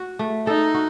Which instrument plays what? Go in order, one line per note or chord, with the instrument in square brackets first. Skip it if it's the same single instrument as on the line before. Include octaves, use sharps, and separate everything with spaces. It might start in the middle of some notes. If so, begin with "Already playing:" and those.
Already playing: [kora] F#4
A3
[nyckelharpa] D#4 [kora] A4
[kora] F#4